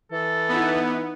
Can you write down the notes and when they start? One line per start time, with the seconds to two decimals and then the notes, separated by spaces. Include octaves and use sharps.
0.12 E3 A4
0.49 B3 D#4 E4